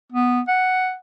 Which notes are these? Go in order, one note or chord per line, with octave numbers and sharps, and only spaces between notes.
B3
F#5